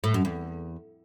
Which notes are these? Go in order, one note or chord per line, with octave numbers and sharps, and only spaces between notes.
A2
F#2
E2